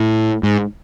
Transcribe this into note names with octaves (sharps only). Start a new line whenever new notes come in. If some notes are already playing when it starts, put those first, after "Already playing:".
Already playing: A2
G#2